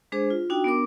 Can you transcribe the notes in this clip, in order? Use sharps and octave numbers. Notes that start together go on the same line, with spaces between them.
G#3 D4 G#4 C5
F4
D4 D#4 F#4 G5
B3 D4 A#4 D6